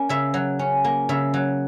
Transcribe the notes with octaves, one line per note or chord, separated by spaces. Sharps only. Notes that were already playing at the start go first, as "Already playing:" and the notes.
Already playing: A#3 C#4
C#3 E5
F#3
C#4
A#3
C#3 E5
F#3